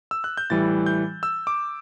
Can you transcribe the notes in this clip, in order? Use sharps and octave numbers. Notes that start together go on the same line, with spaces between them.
E6
F#6
G6
A2 E3 G3 A6
G6
E6
D6